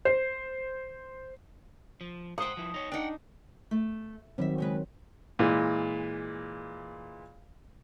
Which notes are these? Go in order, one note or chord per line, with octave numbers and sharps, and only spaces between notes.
C5
F3
G#2 C5 F#5 G5 D#6
F3 E4
D#4 C#5
D4 D#4 F#5 G5
A3
D#3 F#3 G3 C4 E5
C#3 G#3 B4
A#2 E3 G#3